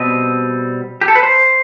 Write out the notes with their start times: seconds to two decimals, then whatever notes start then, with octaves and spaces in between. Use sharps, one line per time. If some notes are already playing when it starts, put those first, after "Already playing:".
Already playing: B2 G3 C4 D#5
1.01 G4
1.08 A4
1.15 B4
1.23 C5